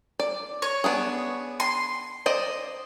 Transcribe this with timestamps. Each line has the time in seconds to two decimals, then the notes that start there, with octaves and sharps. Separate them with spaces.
0.20 D5
0.62 C#5
0.84 B3 D4 G#4
1.60 C6
2.26 C5 D5 D#5